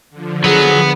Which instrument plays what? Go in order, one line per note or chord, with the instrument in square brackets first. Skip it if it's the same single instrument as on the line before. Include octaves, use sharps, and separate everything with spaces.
[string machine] D3 F3
[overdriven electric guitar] F#3 [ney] G#4 [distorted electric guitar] B4 F#5